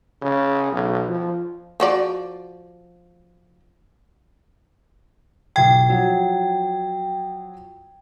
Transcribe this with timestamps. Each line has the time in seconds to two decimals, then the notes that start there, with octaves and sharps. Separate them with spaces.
0.22 C#3
0.72 B1
1.08 F3
1.80 F3 F#4 D5
5.56 B1 G5 G#6
5.89 F3 F#3